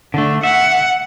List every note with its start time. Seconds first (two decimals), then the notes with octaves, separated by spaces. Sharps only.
0.14 D3 A3 D4
0.43 E5 F#5